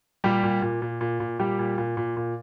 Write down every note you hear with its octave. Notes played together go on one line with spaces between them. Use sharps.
A#2 G3 G4
A#2
A#2
A#2
A#2
A#2
A#2 G3 G4
A#2
A#2
A#2
A#2